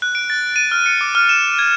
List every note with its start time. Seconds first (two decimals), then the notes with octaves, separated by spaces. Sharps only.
0.02 F#6
0.15 D7
0.30 A6
0.56 D#7
0.72 F6
0.86 C#7
1.01 D6
1.15 F6
1.29 E7
1.59 G#6